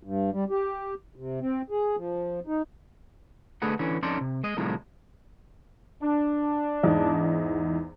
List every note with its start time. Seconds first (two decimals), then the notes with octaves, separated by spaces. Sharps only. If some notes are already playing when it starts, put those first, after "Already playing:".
0.03 G2
0.32 G3
0.50 G4
1.16 C3
1.40 C4
1.70 G#4
1.96 F3
2.47 D#4
3.62 D2 D3 A3 G#4 B4 F#5
3.79 D3 E3 C#4
4.03 F2 C#4 D#4 A4 D5 C6
4.21 C3
4.44 G#3 D#5
4.57 C2 A2 C3 D#3 F3 G#3
6.02 D4
6.83 E2 G#2 D#4